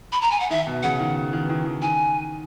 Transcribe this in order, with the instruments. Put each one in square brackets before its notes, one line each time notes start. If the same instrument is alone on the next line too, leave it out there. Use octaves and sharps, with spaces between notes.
[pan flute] B5
A#5
G#5
F#5
[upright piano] D#3 [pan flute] E5
[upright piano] B2
[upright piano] C#3 [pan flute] F#5
[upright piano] D#3
D#3
E3
D#3
D#3
[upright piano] D#3 [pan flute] G#5